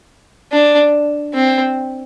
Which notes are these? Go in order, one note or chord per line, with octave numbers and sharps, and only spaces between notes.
D4
C4